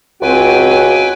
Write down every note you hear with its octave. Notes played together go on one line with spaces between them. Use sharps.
C#2 C4 F#4 B4 G5 G#5